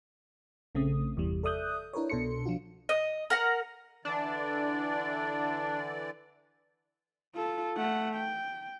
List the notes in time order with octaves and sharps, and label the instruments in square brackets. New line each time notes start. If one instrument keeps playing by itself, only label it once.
[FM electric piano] A#1 C#3 A3 C4 D#6
G1 E2 C3 E3 G3
A4 D5 E5 D#6 F#6 G6
D4 E4 A#4 B4 C#5
C2 B2 D4 A4 C6 C#7
F3 D4 F4 F#4
[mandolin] D#5
A#4 F#5 A#5
[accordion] D3 E3 D5 [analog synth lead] D4
[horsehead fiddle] F4 A4
A3 F#5
G5